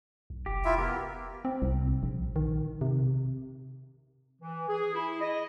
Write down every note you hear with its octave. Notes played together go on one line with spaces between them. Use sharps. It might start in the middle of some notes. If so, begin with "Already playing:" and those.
B1
F1 G4
E4 F4 E5
B3 G4 A#4
C4
C2
A#1
D#3
C3
E3
G#4
E4
D#5